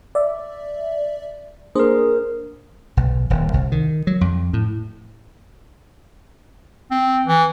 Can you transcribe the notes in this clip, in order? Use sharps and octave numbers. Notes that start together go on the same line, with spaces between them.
D5 E5
A#3 D4 G#4 A#4 C5
B1
D#1
C2
D#3
F#3
F2
A2
C4
E3